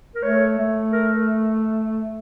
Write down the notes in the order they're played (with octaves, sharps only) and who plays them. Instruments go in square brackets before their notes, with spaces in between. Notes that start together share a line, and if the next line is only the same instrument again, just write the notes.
[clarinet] A#4
[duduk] A3 [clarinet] C#5
[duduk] A3
[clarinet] A#4